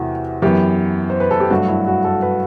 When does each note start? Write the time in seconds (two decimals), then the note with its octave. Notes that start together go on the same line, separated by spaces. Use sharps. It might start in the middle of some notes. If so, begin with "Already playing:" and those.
Already playing: E2 C3 E3 A3 F#4
0.42 F#2 E3 B3 G4
1.10 C5
1.20 B4
1.31 A4
1.40 G4
1.50 G2 F#3 A3 F#4
1.68 E4
1.87 F#4
2.04 A4
2.22 B4